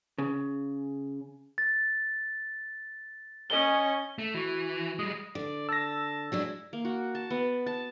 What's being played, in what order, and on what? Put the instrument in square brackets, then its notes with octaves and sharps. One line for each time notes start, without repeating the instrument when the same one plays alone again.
[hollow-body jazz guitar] C#3
[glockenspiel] A6
[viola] C#4 [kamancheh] D#5 G#5 [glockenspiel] G7
[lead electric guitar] A3 [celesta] E7
[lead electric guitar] E3 [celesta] F#4 C#6
[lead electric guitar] G3 G#3 [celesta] D#6
[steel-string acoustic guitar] D3 [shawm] D5
[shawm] A5 [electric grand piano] E6 A#6
[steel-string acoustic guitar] F#3 G#3 D4 [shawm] E4
[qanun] A#3
F#4
A5
B3
A5